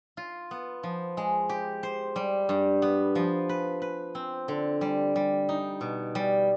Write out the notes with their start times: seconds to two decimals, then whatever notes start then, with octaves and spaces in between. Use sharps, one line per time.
0.17 F4
0.51 B3
0.83 F3
1.17 G#3
1.49 G4
1.83 C5
2.16 G3
2.49 G2
2.82 B3
3.15 F3
3.49 B4
3.82 B4
4.15 C4
4.48 D3
4.81 G3
5.16 G3
5.49 D#4
5.81 B2
6.15 G3